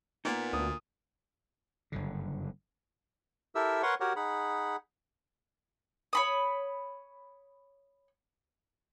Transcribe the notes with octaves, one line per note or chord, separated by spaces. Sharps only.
A#2 A#3 B3 D#4
D2 D#6
F#1 G2 D3
E4 G4 A4 A#4 E5 E6
A#4 B4 C#5 F#5 C6 C#6
F#4 G4 A#4 C#5 F#5
D#4 G#4 F#5 B5
C#5 B5 D#6